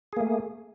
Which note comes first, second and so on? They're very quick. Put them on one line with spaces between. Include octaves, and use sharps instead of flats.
G#4 A#3 A3